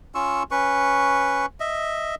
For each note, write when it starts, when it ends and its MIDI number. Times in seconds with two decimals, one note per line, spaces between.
0.15 0.43 61
0.15 0.43 65
0.15 0.43 85
0.15 0.43 88
0.51 1.46 61
0.51 1.46 71
0.51 1.46 85
1.60 2.15 75
1.60 2.15 76